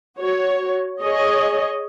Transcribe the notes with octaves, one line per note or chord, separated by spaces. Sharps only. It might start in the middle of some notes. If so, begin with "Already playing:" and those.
F#4 C#5
G#4 C#5 D#5